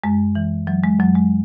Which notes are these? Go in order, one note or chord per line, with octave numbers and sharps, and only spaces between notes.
F#2 G#3
E3
E3 F#3
G#3
F#2 F#3
G#3